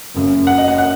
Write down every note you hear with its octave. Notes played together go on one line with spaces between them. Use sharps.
F#1 F#2 C#3
F#5
D#5
F#5
F#5